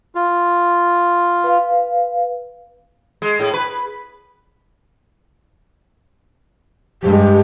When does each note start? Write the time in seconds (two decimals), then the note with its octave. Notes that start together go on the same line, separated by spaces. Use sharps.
0.15 F4
1.44 B4 F5
3.22 G#3
3.39 A2
3.54 B4
7.03 G2 G#3 G4